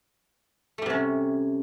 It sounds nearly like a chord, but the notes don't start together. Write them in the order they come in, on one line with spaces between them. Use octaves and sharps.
A3 G3 C3 C#4